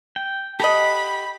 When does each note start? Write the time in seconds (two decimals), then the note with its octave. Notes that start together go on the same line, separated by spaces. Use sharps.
0.16 G5
0.60 G4 A4 D#5 F#5 B5